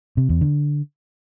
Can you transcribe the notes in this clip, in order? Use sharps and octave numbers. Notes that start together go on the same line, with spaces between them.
C3
E2
D3